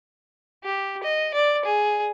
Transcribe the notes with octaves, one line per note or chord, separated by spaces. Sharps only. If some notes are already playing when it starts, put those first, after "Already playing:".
G4
D#5
D5
G#4